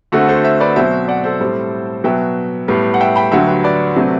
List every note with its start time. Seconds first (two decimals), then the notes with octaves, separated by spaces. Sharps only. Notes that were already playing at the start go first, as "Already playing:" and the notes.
0.12 D2 D3 A3 C4 F#4 A4
0.28 A4 C5
0.44 C5 E5
0.60 B4 D5
0.76 B2 F#3 C4 C5 E5
1.08 D5 F#5
1.24 A4 C5
1.40 A2 G3 C4
2.04 B2 F#3 B3 E5 G5
2.68 A2 G3 B3
2.94 F#5
3.00 E5 G5
3.16 G5 B5
3.32 D2 D3 F#3 E5 G5
3.47 G4 B4
3.64 B4 D5
3.96 C3 F#3 A3 C4